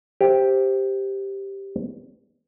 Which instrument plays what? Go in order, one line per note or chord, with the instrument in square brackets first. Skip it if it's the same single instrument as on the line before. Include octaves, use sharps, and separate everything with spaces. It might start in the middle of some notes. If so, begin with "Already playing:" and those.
[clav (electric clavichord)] G4 C5 E5 G5